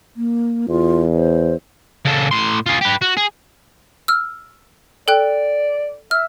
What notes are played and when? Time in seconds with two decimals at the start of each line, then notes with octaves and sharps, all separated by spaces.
0.17 A#3
0.69 E2 F4
1.15 C5
2.05 C#3 A4
2.31 A2 C6
2.66 F4 G#4
2.81 G4 B4
3.02 F#4
3.17 G#4
4.08 E6 F6
5.08 A4 D5 G5 F#6
6.11 E5 F6